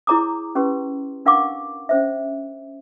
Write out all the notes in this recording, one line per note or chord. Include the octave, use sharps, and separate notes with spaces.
E4 G#4 C#5 A#5 D6 D#6
C#4 G4 B4 C6
D4 A#4 F5 F#5 C#6 D6
C#4 C5 E5